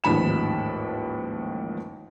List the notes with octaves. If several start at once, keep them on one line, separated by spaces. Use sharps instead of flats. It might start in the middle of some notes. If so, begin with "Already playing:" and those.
A1 D#2 G#2 F3 B5 E7